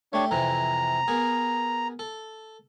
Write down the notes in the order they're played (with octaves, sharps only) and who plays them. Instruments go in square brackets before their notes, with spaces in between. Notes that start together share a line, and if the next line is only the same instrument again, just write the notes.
[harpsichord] A3 G4 [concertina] D4 C#5
[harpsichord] F2 C3 E3 [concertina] A#5
[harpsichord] B3 G#4 A#4
A4